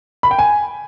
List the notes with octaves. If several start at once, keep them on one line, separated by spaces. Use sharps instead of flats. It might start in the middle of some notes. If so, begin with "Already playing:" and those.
B5
G5
G#5